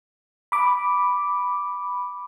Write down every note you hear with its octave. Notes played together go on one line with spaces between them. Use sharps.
B5 D6